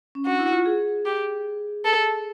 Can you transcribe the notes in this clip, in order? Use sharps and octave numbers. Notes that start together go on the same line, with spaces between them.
C#4
D4 F#4
E4
F4
G#4
G4
A4